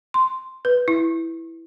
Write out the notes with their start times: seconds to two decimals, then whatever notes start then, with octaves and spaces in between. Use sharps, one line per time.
0.14 C6
0.65 B4
0.88 E4